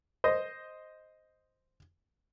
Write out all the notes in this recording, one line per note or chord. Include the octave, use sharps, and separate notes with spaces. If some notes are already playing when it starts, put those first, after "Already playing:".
C5 D#5